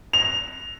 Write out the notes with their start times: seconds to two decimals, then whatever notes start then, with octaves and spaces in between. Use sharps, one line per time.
0.13 F7